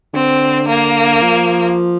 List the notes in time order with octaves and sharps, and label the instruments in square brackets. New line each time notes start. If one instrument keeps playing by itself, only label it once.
[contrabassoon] D3 [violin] C4
[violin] A#3
[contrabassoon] F3